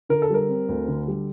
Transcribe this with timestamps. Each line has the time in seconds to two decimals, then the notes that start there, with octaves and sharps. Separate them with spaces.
0.09 D3 A#4
0.22 A4
0.30 G3 A#4
0.49 C4
0.69 D2
0.88 D3
1.08 G3